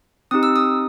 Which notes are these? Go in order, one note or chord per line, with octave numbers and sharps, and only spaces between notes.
C4 D#4 G4 D#6
E6
D#6